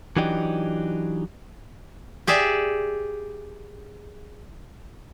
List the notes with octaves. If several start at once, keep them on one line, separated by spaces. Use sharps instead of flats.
E3 F#3 D4 D#4 G4
G4 G#4 D5 E5